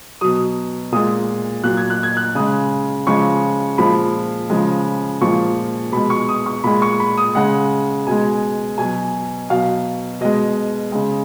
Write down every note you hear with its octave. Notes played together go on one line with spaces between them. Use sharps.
B2 F#3 D#6
A#2 G#3 D#6
A#2 F#3 F#6
G#6
F#6
G#6
F#6
C#3 G#3 D#6
C#3 F3 G#3 C#6
A#2 F3 G#3 B5
C#3 F3 G#3
A#2 F3 G#3 C#6
B2 G#3 B5
C#6
D#6
C#6
A#2 G#3 B5
C#6
B5
D#6
C#3 G#3 F#5
B2 G#3 G#5
B2 F#3 G#5
B2 F#3 F5
B2 G#3 D#5
C#3 G#3